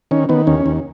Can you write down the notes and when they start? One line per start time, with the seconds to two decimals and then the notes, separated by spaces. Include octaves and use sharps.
0.11 D#3 C#4
0.29 D#3 B3
0.47 D#2 C#4
0.66 D#2